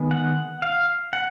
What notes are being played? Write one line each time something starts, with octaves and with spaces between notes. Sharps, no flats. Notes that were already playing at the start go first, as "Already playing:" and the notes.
Already playing: D#3 G#3 B3
F#5
F5
F#5